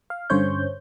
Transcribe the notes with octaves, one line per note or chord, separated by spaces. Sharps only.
F5
G2 D3 C#4 C5 C#5 G6